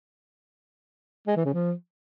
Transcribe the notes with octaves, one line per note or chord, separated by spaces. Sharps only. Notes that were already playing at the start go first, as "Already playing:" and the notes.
G#3
E3
C#3
F3